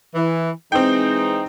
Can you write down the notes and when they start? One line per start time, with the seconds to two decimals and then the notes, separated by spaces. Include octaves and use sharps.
0.15 E3
0.72 E3 G#3 C4 D#4 G5